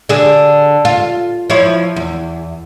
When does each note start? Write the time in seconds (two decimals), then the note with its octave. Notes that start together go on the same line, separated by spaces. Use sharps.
0.09 D3 G#4
0.85 F4
1.50 F3 E4 C#5
1.96 E2